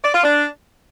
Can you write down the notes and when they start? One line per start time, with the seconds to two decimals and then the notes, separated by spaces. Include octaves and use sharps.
0.04 D5
0.13 F4
0.22 D4